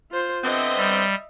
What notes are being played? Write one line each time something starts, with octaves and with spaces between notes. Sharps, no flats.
F4 C5
D3 B3 C4 D#5 E5
G3